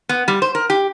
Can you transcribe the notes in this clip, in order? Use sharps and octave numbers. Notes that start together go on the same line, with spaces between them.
B3
G3
C5
A#4
G4